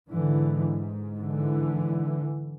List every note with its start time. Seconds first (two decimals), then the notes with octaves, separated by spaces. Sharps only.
0.11 G#2 D3 E3
1.22 D3 E3